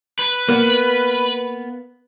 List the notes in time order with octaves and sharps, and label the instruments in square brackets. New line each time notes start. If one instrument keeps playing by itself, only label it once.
[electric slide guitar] B4
[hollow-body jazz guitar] A#3 B3